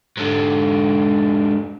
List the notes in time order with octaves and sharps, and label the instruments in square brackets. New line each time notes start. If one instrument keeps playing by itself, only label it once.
[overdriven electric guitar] G#2 D3